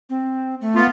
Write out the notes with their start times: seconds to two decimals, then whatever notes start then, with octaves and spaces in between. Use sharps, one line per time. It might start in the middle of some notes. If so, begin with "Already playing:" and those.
0.10 C4
0.61 A3
0.75 B3 F4